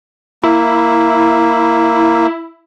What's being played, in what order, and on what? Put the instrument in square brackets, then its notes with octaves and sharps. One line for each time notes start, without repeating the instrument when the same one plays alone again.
[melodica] A#3 [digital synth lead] E4